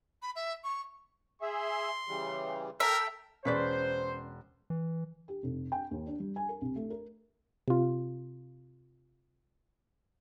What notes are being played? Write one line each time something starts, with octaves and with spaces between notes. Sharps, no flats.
B5
E5
C#6
G#4 E5 C6
C#3 E3 G3
A4 A#4 E5 G5 A#5
E1 C#4 B4 C5 D5 F#6
E3
G4
F1
G5
D#2
D4
G3
G#5
A#4
C2
A3
A#4
C3 F4